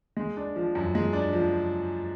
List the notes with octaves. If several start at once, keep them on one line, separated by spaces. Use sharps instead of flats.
G#3
D4
F3
F#2
G#3
D4
F3